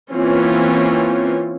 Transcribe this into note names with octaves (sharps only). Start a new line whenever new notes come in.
E3 A#3 C4 C#4 F4